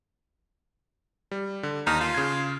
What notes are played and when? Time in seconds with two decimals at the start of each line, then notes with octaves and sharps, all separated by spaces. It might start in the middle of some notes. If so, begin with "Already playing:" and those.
1.31 G3
1.63 D3
1.87 D#2 D#4 F6
2.01 F4
2.14 C#3 G#6